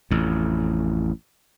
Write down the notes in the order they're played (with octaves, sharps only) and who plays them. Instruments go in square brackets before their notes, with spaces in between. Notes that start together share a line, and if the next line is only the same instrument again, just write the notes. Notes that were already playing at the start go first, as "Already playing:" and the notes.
[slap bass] A1 F2